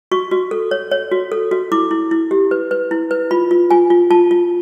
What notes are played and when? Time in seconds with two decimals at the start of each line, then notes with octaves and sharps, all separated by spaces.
0.12 F#4 C#6
0.31 F#4
0.51 A4
0.71 C#5
0.91 C#5
1.12 F#4
1.32 A4
1.51 F#4
1.72 E4 D6
1.91 E4
2.11 E4
2.31 G4
2.51 B4
2.71 B4
2.91 E4
3.11 B4
3.31 F4 B5
3.51 F4
3.71 F4 G#5
3.90 F4
4.11 F4 A5
4.31 F4